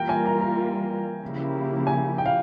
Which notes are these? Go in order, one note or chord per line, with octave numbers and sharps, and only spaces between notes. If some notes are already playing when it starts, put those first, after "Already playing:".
Already playing: E3 G3 A#3 F4 A#4 G5
G#5
A#5
A#5
C#3 F3 A#3 E4 G4
G#5
G5
F5